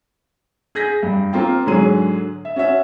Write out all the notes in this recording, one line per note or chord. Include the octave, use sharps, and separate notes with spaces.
G#4 G6 A#6 B6
G2
A#3 C4 F4 G5
G#2 D3 F#3 G#4 D#7
E5
C#4 F#4 E5